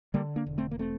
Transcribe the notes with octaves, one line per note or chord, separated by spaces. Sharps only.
D3 G3 A#3
A#3 D4
E1
A3 C4
A#3
A3 C4